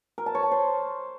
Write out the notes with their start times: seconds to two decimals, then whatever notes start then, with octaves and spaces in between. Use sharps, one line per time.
0.18 A#4
0.26 A5
0.35 C#5
0.43 A5
0.52 C5